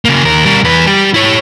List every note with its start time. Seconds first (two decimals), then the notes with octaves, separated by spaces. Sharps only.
0.05 C#3 A#3
0.23 D#2 A#4
0.45 G3 A#4
0.64 E2 B4
0.87 G3 G4
1.14 E4 C#5